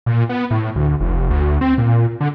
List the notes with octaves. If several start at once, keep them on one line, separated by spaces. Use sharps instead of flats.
A#2
B3
A2
D2
F1
D2
C4
A#2
D3